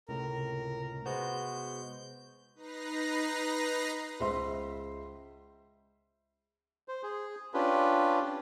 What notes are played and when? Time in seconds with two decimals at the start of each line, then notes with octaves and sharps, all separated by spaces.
0.08 C#2 A2 C3 A#4
1.06 G#3 B3 F#4 C5 G6
2.55 D#4 B4 A#5 A#6 C7
4.20 C#2 C5 E5 C6
6.88 C5
7.03 G#4
7.54 C#4 D4 F4 G4 B4